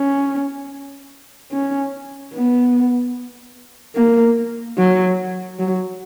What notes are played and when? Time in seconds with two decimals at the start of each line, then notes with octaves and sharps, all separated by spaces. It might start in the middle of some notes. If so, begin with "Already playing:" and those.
Already playing: C#4
1.51 C#4
2.34 B3
3.96 A#3
4.78 F#3
5.59 F#3